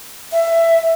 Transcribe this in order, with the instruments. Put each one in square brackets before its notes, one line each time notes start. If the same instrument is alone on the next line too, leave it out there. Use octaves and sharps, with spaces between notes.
[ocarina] E5